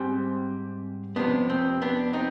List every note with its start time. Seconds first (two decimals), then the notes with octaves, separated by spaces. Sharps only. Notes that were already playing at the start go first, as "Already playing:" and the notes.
Already playing: G#2 G3 C4
1.16 F2 C3 F3 B3 D4
1.50 C4
1.82 B3 D4
2.13 C4 D#4